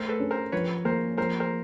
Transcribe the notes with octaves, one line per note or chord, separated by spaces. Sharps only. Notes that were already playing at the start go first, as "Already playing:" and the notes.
Already playing: A3 A#4 C5
A4 B4
C#4
A#4 C5
F3 B4 C#5
A#3 A#4 C5
F3 A#4 C5
A#4 C5